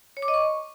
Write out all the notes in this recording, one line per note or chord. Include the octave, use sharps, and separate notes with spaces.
C#5
D6
D#5
C#6